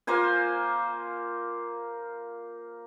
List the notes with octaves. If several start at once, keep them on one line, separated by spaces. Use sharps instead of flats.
A#3 F4 C5 G#5